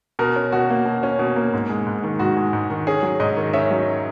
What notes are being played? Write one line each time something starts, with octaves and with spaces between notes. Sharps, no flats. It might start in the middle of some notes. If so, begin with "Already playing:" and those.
B2 A#4
C#4
B2 F#4
A#3
B2
C#4
B2
A#3
G#2
G#3
G#2
D#3
G#2 F#4
G#3
G#2
D#3
C#4 G#4
F#3
G#2 D#5
D#3
C#4 E5
F#3